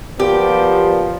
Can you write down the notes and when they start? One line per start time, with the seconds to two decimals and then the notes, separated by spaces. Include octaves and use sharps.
0.19 A#2 F3 B3 G4